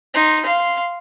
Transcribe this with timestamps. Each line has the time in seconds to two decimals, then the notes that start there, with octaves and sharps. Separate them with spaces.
0.14 D#4 C6
0.43 F5 C6